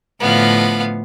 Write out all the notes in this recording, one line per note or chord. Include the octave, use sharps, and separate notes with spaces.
A2 D3 F3 B3 F5